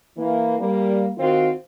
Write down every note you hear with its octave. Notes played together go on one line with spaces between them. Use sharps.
E3 A#3
G3 A#3
D#3 C4 F4 F#4